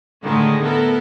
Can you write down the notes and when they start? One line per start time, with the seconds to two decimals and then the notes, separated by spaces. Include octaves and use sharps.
0.24 A2 D3 D#3 G#3 A3 E4
0.63 B3 E4 A4 A#4